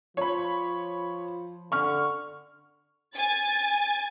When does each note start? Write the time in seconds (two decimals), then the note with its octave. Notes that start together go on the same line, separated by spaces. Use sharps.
0.17 F3 C#5 B5
1.72 D3 C#6 F6
3.14 G#5 A6